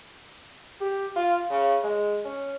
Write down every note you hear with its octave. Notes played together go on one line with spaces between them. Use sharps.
G4
F4
C#3
G#3
C#4